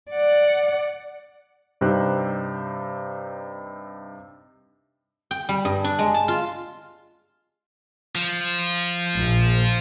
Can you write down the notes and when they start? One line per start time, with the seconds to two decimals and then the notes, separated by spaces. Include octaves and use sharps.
0.11 D5 F#5
1.81 G2 C3 D#4 G4 C5 F#6
5.31 G5
5.49 G3
5.65 G2
5.84 D4
5.99 G#3
6.14 A5
6.28 F4
8.15 F3
9.16 A#1